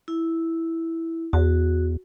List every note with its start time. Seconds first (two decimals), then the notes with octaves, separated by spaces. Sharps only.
0.08 E4
1.33 E2 F#4